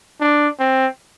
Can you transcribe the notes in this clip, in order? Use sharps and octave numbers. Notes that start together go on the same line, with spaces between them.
D4
C4